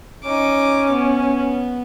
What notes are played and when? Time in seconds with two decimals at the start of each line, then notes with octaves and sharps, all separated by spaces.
0.24 C#4 D#4 D6
0.91 B3